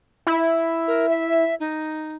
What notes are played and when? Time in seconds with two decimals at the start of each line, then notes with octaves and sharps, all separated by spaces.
0.27 E4
0.87 A#4
1.09 E5
1.60 D#4